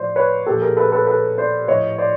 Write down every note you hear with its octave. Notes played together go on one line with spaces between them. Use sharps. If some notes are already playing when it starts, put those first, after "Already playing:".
Already playing: A2 F3 C5 D5
B4 C#5
A#2 F3 G4 A4
G#4 A#4
A4 B4
A4 B4
A4 B4
C5 D5
A2 F3 C#5 D#5
C5 D5